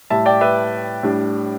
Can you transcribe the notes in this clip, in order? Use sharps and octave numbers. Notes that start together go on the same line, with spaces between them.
A2 G3 E4 E5 A5
D5 G5
B4 E5
A2 G3 D4